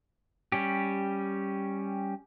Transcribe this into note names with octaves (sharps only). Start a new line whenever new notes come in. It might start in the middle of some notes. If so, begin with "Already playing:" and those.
G3 C#4 G4